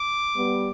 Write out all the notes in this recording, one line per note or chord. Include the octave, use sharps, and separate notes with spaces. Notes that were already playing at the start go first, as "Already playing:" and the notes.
Already playing: D6
G3 B3